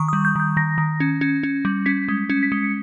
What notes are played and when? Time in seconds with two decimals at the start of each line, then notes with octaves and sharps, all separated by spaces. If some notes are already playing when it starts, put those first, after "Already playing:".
Already playing: D#3 C#6
0.08 G3 D#6
0.25 G6
0.36 D#3 G6
0.57 D#3 A#6
0.78 D#3
1.00 C#4
1.21 C#4
1.43 C#4
1.65 G3
1.86 C#4 B6
2.08 G#3
2.30 C#4
2.43 B6
2.52 G#3 C#7